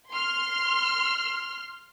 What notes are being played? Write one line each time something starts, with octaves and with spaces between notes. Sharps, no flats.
C6 F6